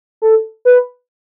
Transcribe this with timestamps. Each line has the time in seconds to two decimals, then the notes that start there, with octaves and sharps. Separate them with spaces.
0.22 A4
0.65 B4